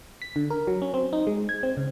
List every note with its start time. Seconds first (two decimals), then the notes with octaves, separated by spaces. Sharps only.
0.22 B6
0.36 D3
0.50 A#4
0.67 F#3
0.82 C#4
0.94 C4
1.13 D#4
1.27 G#3
1.49 G#6
1.63 C4
1.77 C#3